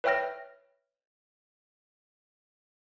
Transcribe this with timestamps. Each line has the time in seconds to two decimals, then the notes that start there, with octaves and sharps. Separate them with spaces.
0.04 B4 C#5 E5 G5 F6 A#6